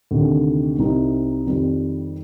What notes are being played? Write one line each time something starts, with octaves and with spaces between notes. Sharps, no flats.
D2 C3 D#3
C2 C3 G3 C4 D#4
F2 D#3 G3 C4